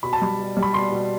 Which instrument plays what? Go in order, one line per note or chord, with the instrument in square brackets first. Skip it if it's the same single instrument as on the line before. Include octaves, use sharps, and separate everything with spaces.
[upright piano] B2 B5
A5
G3 B5
B2
G3
B5
B2 C6
B2